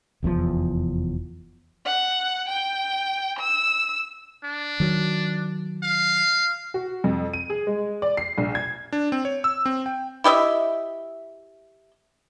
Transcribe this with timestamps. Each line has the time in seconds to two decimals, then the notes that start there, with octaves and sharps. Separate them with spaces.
0.23 F1 E2 G2 F3
1.86 F#5
2.49 G5
3.39 E6
4.44 D4
4.80 D#3 F#3
5.83 F5
6.74 F#4
7.04 F2
7.33 D#7
7.50 G#4
7.67 G#3
8.02 D5
8.17 C7
8.38 A#1
8.55 G#6
8.93 D4
9.12 C4
9.25 C#5
9.44 E6
9.66 C4
9.86 G5
10.24 E4 G4 D#5 E5